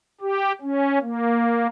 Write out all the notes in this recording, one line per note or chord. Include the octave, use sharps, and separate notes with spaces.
G4
C#4
A#3